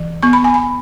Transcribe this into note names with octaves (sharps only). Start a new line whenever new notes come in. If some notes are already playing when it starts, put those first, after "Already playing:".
Already playing: E3
B3 C#6
B5
G#5
B5